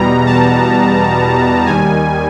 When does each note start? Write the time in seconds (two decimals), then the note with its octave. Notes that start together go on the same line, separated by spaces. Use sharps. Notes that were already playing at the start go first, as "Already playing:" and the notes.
Already playing: E2 B2 G3 B3 A#5
0.26 A5
1.66 D#2 D#3 G3 G#5